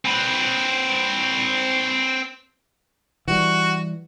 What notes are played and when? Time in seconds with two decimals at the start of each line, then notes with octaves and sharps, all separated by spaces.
0.05 C4 B4
3.28 E3 G3 F#4